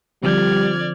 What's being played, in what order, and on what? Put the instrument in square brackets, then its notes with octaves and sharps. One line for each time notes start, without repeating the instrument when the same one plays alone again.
[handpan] D3 F3 C4 [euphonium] G3 [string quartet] D5 F6 G#6